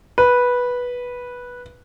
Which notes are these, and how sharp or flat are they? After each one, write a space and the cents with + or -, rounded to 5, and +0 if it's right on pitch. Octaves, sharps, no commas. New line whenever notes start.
B4 -10